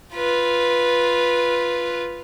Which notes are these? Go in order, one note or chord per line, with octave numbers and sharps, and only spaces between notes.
F4 B4